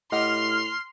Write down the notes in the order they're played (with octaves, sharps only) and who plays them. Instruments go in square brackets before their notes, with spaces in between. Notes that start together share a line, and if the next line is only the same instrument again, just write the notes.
[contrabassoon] A2 [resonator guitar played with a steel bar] G4 D#5 F#5 [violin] C6 [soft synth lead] F6